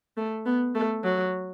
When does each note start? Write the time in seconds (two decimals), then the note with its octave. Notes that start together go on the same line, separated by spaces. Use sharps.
0.17 A3
0.46 B3
0.75 A3
1.04 F#3